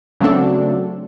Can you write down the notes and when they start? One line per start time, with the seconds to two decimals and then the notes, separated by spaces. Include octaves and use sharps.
0.20 C#3 F#3 A3 C4 D4 A4